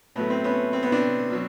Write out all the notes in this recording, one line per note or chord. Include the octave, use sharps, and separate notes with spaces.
A2 F#3 A3 B3
C4
B3 C#4
C4
B3
C4 D4
B2 F#3